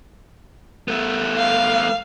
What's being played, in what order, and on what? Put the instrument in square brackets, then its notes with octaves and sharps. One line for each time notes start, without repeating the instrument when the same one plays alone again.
[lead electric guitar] A3 B3
[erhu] F5